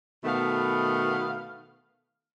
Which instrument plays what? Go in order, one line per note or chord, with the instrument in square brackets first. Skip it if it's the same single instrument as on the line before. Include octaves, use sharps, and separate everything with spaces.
[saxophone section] B2 D#3 A3 B3 F5